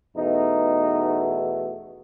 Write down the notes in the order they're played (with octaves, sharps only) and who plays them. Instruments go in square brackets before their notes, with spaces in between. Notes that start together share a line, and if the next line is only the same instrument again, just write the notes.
[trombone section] E2 B2 A3 D#4